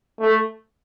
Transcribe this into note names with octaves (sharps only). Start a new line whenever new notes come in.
A3